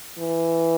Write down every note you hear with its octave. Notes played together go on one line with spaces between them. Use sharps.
E3